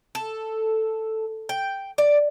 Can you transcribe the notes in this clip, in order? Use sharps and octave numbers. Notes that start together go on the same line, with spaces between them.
A4
G5
D5